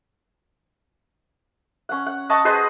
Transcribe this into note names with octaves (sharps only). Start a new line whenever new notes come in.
C#4 F#5
F#5
D#5 F#5 A5 C#6
G#4 B4 C5 D#5